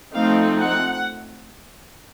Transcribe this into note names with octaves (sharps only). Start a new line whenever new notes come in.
F3 A3 C4 D#4 F5
F#5